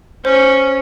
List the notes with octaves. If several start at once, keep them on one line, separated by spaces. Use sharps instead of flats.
C#4 C5